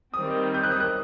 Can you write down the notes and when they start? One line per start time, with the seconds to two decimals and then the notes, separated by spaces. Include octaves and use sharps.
0.14 D#3 G3 C4 D#6
0.54 G6
0.64 F#6
0.72 D#6
0.80 F#6